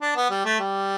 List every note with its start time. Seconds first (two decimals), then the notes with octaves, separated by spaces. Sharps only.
0.01 D4
0.16 B3
0.30 G3
0.45 A3
0.60 G3